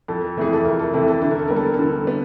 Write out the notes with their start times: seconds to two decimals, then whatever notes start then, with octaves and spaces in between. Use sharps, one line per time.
0.08 F2 A4
0.37 C3 E3 A3 G#4
0.53 A4
0.65 F2 A#4
0.79 A4
0.94 C3 E3 A3 A4
1.08 A4
1.22 D3 A4
1.31 A#4
1.39 A4
1.48 G3 B3 A#4
1.56 A4
1.65 A#4
1.74 A4
1.79 D3 A#4
1.91 A4
2.07 B3